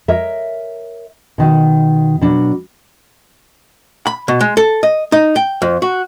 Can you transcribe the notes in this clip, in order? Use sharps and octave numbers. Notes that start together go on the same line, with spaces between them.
A#4 C#5 D#5 E5
B2 D#3
B2 F#3 D4
B5
B2
G#3
A4
D#5
D#4
G5
F2
F#4